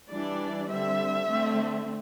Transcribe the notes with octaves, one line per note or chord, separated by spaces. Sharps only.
E3 G3 D4 D5
D3 G3 C4 E5
D3 A3 C4